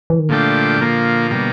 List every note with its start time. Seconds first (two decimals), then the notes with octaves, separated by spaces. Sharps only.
0.10 E3
0.19 D#3
0.29 A#2 D3 F3 A3 D4 G4
0.81 A#2 F3 A#3
1.31 B2 G3 A#3